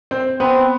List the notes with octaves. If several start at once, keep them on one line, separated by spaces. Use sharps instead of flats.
C4 C5
B3 C4 B4